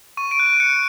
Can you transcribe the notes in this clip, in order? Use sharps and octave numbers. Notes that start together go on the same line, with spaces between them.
C#6 D#7
D7
F#6
D#7
F#6 C#7